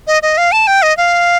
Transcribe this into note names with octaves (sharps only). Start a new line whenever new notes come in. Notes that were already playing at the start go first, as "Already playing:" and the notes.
D#5
D#5
F5
A5
G5
D#5
F5